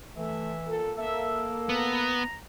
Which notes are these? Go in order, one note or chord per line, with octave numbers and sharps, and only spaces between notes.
E3 A3 E5
A#2 A4
A#3 A4 E5
B3 A#5